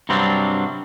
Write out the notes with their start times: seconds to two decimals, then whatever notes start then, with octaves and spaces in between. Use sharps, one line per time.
0.09 G2 C3 F#3 G3 C4 D4